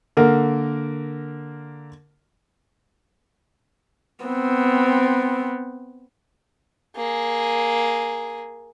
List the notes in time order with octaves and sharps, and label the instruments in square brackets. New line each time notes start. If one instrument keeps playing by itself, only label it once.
[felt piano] D3 A#3 A#4
[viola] B3 C4
[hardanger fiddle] A#3 G#4